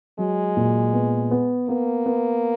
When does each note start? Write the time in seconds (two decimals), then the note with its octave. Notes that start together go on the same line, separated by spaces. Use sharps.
0.18 F#3 G#3
0.57 A#2
0.93 B3
1.31 B3
1.69 A#3 B3
2.06 B3